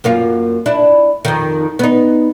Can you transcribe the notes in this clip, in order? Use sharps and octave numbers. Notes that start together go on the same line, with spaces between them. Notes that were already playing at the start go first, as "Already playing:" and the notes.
F#2 A#3 F4
D4 E4
F2 D#3
B3 D#4